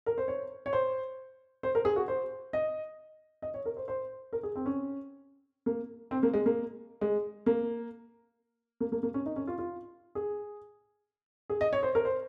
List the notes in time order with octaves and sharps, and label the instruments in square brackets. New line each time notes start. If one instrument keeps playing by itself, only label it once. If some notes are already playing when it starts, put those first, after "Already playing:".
[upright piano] A#4
C5
C#5
C#5
C5
C5
A#4
G#4
F#4
C5
D#5
D#5
C#5
A#4
C5
C5
A#4
G#4
C4
C#4
A#3
C4
A#3
G#3
A#3
G#3
A#3
A#3
A#3
A#3
C#4
D#4
C#4
F4
F4
G#4
G#4
D#5
C#5
C5
A#4
C5